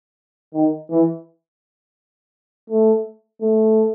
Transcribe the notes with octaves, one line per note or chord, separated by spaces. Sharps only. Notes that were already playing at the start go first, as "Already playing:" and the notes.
D#3
E3
A3
A3